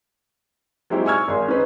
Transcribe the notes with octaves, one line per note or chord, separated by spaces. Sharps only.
F#3 G#3 C4 D#4 E4 G4
G#5 C#6 E6 F6 G#6
G#1 G#4 C6
C#4 D#4 B4 C5